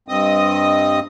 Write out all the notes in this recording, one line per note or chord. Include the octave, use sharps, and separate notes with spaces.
G2 C4 D#5 D#6